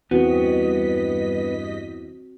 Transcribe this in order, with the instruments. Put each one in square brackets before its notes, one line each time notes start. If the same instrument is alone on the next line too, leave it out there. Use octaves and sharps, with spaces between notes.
[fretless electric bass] E2 [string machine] G2 D#5 B6 [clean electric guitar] B3 [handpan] C4 F#4